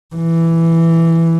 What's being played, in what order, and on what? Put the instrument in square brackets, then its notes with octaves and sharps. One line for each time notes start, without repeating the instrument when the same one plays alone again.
[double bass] E3